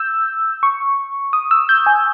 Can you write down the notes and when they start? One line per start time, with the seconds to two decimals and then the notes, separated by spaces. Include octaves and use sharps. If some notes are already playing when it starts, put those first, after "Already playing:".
Already playing: E6 G6
0.63 C#6
1.33 D#6
1.51 E6
1.69 G6
1.86 G#5